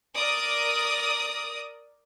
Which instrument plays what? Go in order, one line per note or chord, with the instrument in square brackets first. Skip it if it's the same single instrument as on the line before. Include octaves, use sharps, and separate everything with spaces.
[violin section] A#4 D5 D#6